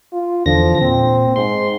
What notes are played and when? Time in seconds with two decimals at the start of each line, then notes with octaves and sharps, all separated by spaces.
0.12 F4
0.46 E2 D3 F3 A#6
0.81 A#2 C4
1.36 G#2 C6